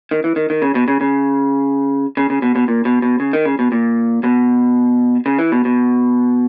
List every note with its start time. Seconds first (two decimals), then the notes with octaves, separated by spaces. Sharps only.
0.11 D#3
0.24 E3
0.36 D#3
0.50 D#3
0.62 C#3
0.75 B2
0.88 C#3
1.01 C#3
2.17 C#3
2.30 C#3
2.42 B2
2.56 B2
2.68 A#2
2.85 B2
3.02 B2
3.20 C#3
3.33 D#3
3.46 C#3
3.59 B2
3.72 A#2
4.24 B2
5.26 C#3
5.39 E3
5.52 B2
5.65 B2